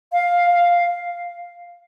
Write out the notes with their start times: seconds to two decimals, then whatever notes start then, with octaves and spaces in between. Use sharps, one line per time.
0.12 F5
0.51 F5